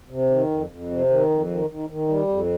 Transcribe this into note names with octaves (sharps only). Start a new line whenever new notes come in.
C3
D#3
F2
F2
C3
D#3
F2
D#3
D#3
D#3
G3
F2